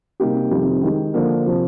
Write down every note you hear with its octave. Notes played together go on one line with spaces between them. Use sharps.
C3 G3 A#3 D#4 G4
F2 C3 D#3 G3
D#3 G#3 D#4 G4
D3 F3 A#3 D4
C3 F3